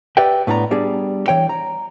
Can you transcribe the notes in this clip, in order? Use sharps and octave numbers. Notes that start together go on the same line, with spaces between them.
G4 B4 D5 E5 F#5 G5
A2 B3 D4 D5 A#5
G3 B3 D4 G#4
E3 C#5 G5
A#5